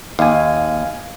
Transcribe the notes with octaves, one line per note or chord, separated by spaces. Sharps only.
D#2 F5 G#5